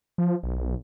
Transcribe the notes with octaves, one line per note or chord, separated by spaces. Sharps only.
F3
B1